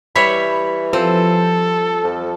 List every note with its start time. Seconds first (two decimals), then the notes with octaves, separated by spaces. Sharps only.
0.15 E3 G3 C#5 E5 B5
0.93 F3 C4 A4
2.04 F2